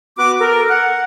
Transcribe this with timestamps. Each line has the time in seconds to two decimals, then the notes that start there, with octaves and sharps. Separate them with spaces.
0.18 B3 F#4 B4 D6
0.40 A4 A#4
0.70 F#5